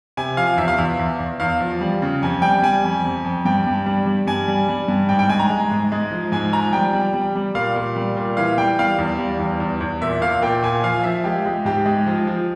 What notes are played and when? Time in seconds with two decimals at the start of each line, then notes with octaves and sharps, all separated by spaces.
0.17 C3 G#5
0.37 F3 F5
0.57 E2 E5
0.68 F5
0.78 E2 E5
0.99 E2
1.19 E2
1.40 E2 F5
1.60 F3
1.81 G3
2.02 C#3
2.22 F2 G#5
2.42 G3 G5
2.62 G3 G#5
2.84 F2
3.05 F2
3.24 F2
3.45 G2 G5
3.66 G2
3.86 G3
4.06 G3
4.27 G2 G#5
4.48 G3
4.69 G3
4.88 G2
5.09 G#2 G5
5.19 G5
5.29 G#3 G#5
5.39 A#5
5.50 G#3
5.71 G#2
5.92 G#3
6.11 F3
6.32 G#2 G#5
6.52 F3 A#5
6.73 G3 G5
6.93 G3
7.14 G3
7.35 G3
7.55 A#2 F5
7.76 A#2
7.96 G3
8.17 A#2
8.37 E3 F5
8.57 G3 G5
8.79 G3 F5
8.98 E2
9.19 G3
9.39 E2
9.60 E2
9.81 E2
10.01 A#2 E5
10.21 A#2 F5
10.42 A#2 G5
10.63 A#2 G#5
10.83 F3 F5
11.04 F3 E5
11.24 G#3 G4
11.46 G#3
11.65 G#2 G4
11.86 G#3
12.07 F3
12.27 F3